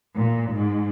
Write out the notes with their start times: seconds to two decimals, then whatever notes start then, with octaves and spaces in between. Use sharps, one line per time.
0.15 A#2
0.50 G#2